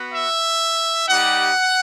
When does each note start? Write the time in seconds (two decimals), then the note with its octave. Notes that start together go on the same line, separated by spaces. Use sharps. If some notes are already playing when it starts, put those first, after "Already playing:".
Already playing: B3 F#4
0.14 E5
1.09 G3 D#4 G4 F#5